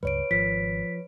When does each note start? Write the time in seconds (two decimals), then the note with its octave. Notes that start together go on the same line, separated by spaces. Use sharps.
0.03 C#2 G2 G3 B4 C#5 D7
0.31 G#1 F3 B6